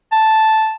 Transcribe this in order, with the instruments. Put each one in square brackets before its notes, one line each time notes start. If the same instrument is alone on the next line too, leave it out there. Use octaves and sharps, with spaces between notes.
[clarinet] A5